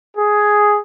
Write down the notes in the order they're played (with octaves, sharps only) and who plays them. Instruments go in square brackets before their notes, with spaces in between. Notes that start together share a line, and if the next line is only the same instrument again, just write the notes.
[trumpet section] G#4